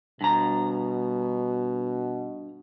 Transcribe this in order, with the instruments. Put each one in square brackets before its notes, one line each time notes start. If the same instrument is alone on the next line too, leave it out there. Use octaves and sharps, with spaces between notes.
[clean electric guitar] G2 A#5 [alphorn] B2